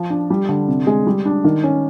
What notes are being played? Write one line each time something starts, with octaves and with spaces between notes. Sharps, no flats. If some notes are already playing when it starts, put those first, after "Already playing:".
Already playing: F3 F4
D4
G3
D3
C3
G#3
G3
D4
D#3
C#4